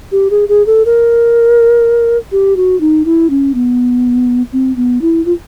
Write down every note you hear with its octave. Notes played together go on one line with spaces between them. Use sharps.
G4
G#4
G#4
A4
A#4
G4
F#4
D#4
E4
C#4
B3
C4
B3
E4
F4